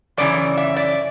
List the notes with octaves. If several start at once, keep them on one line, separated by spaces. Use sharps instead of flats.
F#2 C#3 E3 D5
E5
D5